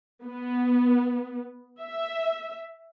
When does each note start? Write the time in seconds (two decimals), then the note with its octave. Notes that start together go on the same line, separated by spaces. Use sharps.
0.25 B3
1.80 E5